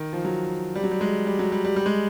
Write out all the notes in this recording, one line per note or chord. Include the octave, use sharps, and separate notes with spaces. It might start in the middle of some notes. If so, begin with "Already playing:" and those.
Already playing: D#3
F3
F#3
G3
F#3
G3
G#3
G3
F#3
G3
G3
G3
G#3